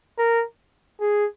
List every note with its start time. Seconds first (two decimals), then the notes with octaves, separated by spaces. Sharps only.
0.18 A#4
1.00 G#4